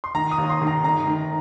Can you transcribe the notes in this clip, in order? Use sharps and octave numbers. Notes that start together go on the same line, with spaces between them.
C6
D#3 A#5
D#6
D#2
C6
D#3
A#5
G1 A#5
D#3